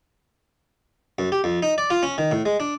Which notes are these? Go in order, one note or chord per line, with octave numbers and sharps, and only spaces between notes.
F#2
G4
F2
D#4
D5
F4
C#4
D#3
A2
G#3
D4